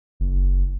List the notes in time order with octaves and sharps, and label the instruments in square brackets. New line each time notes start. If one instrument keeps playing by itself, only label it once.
[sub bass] F#1